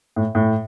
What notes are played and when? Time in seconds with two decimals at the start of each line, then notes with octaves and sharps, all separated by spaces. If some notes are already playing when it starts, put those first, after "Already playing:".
0.16 A2
0.35 A2